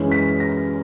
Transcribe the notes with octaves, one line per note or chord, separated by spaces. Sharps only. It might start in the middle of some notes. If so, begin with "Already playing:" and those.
Already playing: F#2 E3 G#3 C#4
B6
A#6